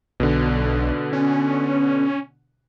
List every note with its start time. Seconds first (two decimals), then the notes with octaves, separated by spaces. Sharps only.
0.20 B1 B2 D3
1.13 C#4